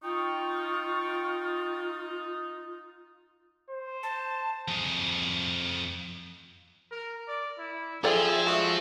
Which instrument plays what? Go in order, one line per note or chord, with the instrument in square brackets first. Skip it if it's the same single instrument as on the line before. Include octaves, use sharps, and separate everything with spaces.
[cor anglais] D#4 [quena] F4 [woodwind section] G5 C#6
[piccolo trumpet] C5
[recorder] A5
[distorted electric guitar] F2 G#4
[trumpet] A#4
D5
E4
[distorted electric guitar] F4 C5 [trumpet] G#4 [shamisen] A4 D5 G5 [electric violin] E5
[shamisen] G#3 [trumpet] F#4